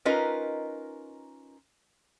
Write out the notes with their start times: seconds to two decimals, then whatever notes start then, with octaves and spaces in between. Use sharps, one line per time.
0.05 C#4 D#4 F4 A#4 B4 D#5